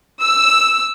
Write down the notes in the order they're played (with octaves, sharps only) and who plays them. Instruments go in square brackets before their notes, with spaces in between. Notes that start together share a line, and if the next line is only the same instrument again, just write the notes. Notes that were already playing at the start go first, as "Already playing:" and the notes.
[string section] E6